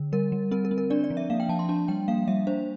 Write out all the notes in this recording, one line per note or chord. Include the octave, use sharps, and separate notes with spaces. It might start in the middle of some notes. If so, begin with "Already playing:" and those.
Already playing: D3
G3 A#4
G3
C4 A#4
A#4
C4
A#4
D4 D5
D5
F3
E5
A#3 F5
G5
F3 A5
C6
D4 A5
G3 G5
A#3 F5
G3 E5
D4 C5